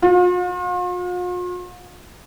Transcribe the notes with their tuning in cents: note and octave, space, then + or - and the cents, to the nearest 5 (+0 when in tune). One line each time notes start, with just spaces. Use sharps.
F4 +45